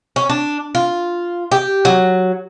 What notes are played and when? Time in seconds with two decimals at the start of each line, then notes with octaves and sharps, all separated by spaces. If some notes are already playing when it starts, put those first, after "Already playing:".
0.16 C#4
0.30 D4
0.75 F4
1.52 G4
1.85 F#3